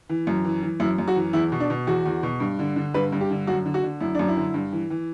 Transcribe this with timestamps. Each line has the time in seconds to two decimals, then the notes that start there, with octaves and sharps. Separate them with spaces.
0.09 E3
0.27 F#2
0.45 E3
0.63 E3
0.80 F#2 E4
0.98 F#2
1.08 F#4
1.16 E3
1.33 E2 E4
1.52 B2
1.60 D4
1.70 B2
1.87 E2 F#4
2.06 E2
2.23 B2
2.40 G2
2.59 D3
2.76 D3
2.94 G2 B4
3.12 G2
3.21 G4
3.30 D3
3.47 F#2 F#4
3.66 D3
3.74 F#4
3.84 D3
4.00 F#2 E4
4.15 F#2 D4
4.28 E4
4.36 D3
4.54 G2
4.72 E3
4.90 E3